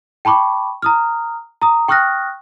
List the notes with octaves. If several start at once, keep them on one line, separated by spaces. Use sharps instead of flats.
G5 A5 B5 C#6 D6
A#5 D#6 F6
A#5 D#6
G5 C#6 D#6 F6 F#6 A#6